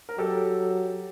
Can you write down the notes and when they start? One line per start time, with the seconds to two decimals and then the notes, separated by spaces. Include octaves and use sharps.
0.09 A#4
0.18 F#3 G4 A4